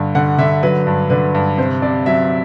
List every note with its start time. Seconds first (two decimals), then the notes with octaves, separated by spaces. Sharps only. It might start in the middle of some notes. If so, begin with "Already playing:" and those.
Already playing: G2 D3
0.15 D3 F#5
0.38 D3 E5
0.63 F#3 B4
0.87 G2
1.10 D3 B4
1.35 G2
1.58 C3 C5
1.82 C3 D5
2.06 F#3 E5